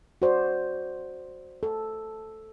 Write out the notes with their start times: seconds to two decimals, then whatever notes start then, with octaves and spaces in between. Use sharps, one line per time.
0.22 F#4 C5 D5
1.63 A4